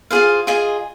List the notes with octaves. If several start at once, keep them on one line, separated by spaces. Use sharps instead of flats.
F4 G#4 C5 F5
F4 G#4 D#5 G#5